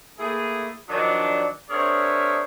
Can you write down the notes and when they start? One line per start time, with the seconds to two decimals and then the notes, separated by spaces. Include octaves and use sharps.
0.19 A3 A#3 E4 G#4
0.89 D#3 F3 F#3 D4
1.70 C4 D4 G#4 A#4 C#5 E5